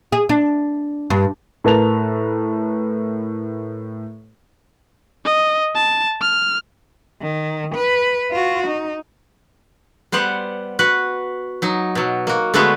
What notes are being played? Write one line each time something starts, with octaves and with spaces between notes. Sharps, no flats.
G#4
D4
G2
A2 A#4 B4 A5 A#5 F7
D#5
A5
F6
D#3
B4
F4 F#4
D#4
G3 B3 C5 F#5
F#4 B4 F#5
F#3 D#4
B2 F#3
A#3 F#4
D3 G#3 A3 B3 F#4 B4